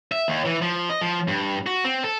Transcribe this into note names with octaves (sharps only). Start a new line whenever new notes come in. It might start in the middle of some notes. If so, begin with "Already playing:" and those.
E5
D#2
E3
F3
D#5
F3
G2
F#4
C4
A4